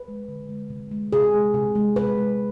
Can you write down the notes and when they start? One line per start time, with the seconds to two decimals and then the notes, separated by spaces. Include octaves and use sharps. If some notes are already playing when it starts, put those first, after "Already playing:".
Already playing: B4
0.08 G#3
0.28 D3
0.49 G#3
0.70 C3
0.92 G#3
1.13 C3 G#4
1.34 G#3
1.54 C3
1.75 G#3
1.96 C3 B4
2.18 G#3